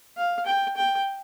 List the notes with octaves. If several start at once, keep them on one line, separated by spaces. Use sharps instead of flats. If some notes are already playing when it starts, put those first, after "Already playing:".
F5
G5
G5